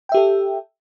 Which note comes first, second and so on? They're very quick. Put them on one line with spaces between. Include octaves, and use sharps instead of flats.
G5 E5 G4 A4